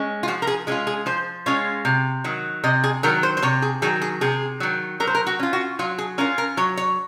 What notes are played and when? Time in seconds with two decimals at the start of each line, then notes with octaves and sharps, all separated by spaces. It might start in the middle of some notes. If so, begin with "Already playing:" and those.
Already playing: G#3 C#4
0.23 F4
0.28 F3 F#4
0.42 A#4
0.47 G#4
0.67 G#3 C#4 F4 G#4
0.87 G#4
1.06 F3 C5
1.46 G#3 C#4 F4 C#5
1.85 C3
2.24 D#3 F#3
2.64 C3 D#5
2.84 G#4
3.03 D#3 F#3 A#4
3.23 C5
3.37 C5
3.42 C3 C#5
3.62 G#4
3.82 D#3 F#3 G#4
4.02 G#4
4.21 C3 G#4
4.60 D#3 F#3
5.00 F#3 A#4
5.07 C5
5.15 A#4
5.27 F#4
5.39 C#4 F4
5.53 F#4
5.79 F#3 F4
5.98 G#4
6.18 C#4 F4 A#4
6.38 A#4
6.57 F#3 C#5
6.77 C#5